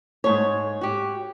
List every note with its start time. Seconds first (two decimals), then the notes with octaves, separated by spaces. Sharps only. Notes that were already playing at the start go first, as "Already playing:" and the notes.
0.24 G#2 B2 C#5
0.81 F#4 G4